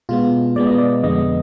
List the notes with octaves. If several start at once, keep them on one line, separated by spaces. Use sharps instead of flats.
B2 G#3 B3 F4
B2 G#3 B3 D5
D#5
D5
F2 D3 G#3 B3 D#5